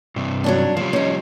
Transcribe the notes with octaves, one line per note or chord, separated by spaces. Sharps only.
G2 C3
F#3 C#4 D4
C#3 F3 G3
C#4 D#4